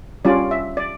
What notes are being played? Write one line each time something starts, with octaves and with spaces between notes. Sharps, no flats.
G3 C#4 F4 D5
E5
D5